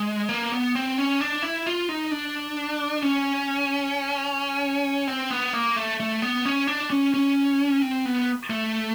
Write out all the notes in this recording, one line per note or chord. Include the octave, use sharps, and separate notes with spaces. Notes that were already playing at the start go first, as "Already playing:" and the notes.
Already playing: G#3
A#3
B3
C4
C#4
D4
E4
F4
D#4
D4
C#4
C4
B3
A#3
A3
A3
B3
C#4
D4
C#4
C#4
C4
B3
A3